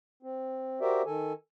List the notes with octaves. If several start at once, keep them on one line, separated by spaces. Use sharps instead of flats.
C4
F#4 G4 A#4 C5 D5 E5
D#3 A4 G#5